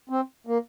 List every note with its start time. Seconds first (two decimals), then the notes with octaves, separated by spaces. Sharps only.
0.09 C4
0.47 A#3